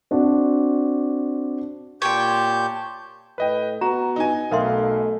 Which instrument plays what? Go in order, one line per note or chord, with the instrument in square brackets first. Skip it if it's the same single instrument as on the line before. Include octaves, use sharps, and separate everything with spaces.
[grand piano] C4 D4 F#4
[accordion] A#2 G4 G6 [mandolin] C#5 G5 [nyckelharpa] A5 C6
[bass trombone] A2 [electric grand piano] B4 D#5 G5
[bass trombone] B3 [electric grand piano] F#4 [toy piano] A#5
[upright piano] D#4 G#5
[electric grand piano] B1 F5 [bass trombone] A3 [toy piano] A#4 E5 C6